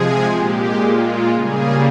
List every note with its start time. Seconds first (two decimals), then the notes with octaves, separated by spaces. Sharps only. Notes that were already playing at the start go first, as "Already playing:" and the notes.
Already playing: C3 F3 G#3 G#4
0.35 A#2 G#3 G4
0.84 F4
1.31 C#3 G3 A#3 G#4